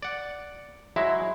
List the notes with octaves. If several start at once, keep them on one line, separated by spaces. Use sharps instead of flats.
D5 F#5
F#3 G#3 E4 E5